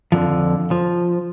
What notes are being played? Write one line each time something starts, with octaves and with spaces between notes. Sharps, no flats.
F2 D3 D#3 F3
F3